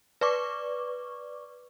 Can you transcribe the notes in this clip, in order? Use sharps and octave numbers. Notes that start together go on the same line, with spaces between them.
B4 D5 C#6 D6